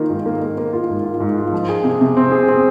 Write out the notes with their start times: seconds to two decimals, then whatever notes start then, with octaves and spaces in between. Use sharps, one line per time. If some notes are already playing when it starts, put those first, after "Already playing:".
Already playing: D#3 A#3 F4
0.09 G#2
0.26 A#3
0.42 A#3
0.58 A#3
0.73 F4
0.89 G#2
1.05 F4
1.20 G#2
1.37 F4
1.53 F3
1.69 G#4
1.84 C3
2.01 C3
2.17 C4
2.32 G#4
2.48 C4